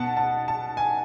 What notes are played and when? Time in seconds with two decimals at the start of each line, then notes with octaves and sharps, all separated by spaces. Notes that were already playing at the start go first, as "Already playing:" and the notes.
Already playing: B2 F#5 A5
0.17 A5
0.48 A5
0.77 G#5